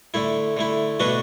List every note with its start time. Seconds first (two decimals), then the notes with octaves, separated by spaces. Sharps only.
0.14 D3 A3 E4
0.57 D3 A3 E4
1.00 B2 A3 D4 F#4 B4